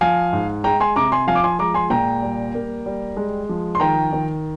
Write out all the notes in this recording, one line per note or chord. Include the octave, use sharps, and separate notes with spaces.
F3 F5 G#5
G#2
G#3 G5 A#5
G#5 C6
C3 A#5 D6
G#5 C6
F3 F5 G#5
D6
G#5 C6
G#3 A#5 D6
G#5 C6
A#2 G5 A#5
G3
A#3
G3
G#3
F3
C6
D#3 G5 A#5
D#3